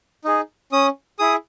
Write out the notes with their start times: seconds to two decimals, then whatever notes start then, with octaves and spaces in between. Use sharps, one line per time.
0.24 D#4 G#4
0.72 C#4 D#6
1.19 E4 G#4 D#6